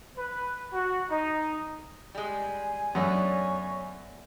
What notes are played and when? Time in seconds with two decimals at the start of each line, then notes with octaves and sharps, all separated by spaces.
0.17 B4
0.72 F#4
1.09 D#4
2.15 G3 G#3 G#5
2.95 F#2 A3 B3 D4 C#5